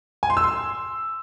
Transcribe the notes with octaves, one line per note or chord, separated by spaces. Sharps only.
G#5
C6
E6
C6